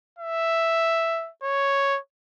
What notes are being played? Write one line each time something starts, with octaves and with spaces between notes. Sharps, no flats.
E5
C#5